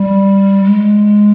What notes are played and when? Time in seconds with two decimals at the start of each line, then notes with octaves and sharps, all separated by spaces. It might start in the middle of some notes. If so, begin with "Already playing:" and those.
Already playing: G3
0.64 G#3